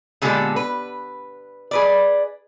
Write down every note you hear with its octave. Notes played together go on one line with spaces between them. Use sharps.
A#2 D3 G#3 B3 G4 A4
B4
G#4 B4 D5